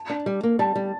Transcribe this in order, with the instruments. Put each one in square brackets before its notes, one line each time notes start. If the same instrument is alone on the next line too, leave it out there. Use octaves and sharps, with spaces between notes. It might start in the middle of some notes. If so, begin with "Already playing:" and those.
Already playing: [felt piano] A5
[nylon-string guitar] D4
G3
A#3
[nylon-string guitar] G3 [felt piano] A5
[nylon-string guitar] G3